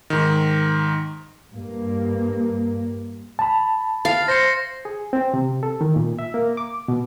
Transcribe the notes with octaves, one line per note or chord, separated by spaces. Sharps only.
G#2 D#3
G2 A#3
A5 B5
F5 A6 C7
C5 A#6 C#7
G#4
C4
C3
A4
D#3
A#2
E5
A#3
D6
B2